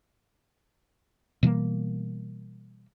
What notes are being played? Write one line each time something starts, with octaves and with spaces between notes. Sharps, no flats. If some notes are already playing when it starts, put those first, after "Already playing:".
B2 E3 G3 A#3